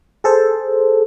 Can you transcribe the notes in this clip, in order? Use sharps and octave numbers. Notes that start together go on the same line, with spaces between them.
G#4 A4 C5